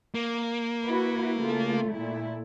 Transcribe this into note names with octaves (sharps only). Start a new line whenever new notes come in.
A#3
E4 F#4 B4
C#3 A3 F4
A#2 A3 E4